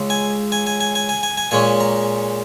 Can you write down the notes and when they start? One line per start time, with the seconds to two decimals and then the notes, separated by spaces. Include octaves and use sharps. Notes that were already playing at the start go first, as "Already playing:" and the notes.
Already playing: C#2 C#3 G#3
0.10 G#5
0.52 G#5
0.67 G#5
0.80 G#5
0.95 G#5
1.09 G#5
1.23 G#5
1.37 G#5
1.51 A#2 G#3 C#4 G#5
1.80 A#5